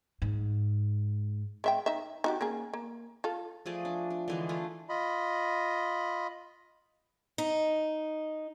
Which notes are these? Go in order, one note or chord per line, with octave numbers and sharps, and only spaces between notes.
G#2
G#3 E5 G5
D#4 E5
D#4 F#4 G4
A#3 C#4 G#4
A#3
F4 A4
F3 A3 G#4 D5
D4
D4
D3 E3 G#3
A3 D4 E4 F4
F4 D#5 B5
D#4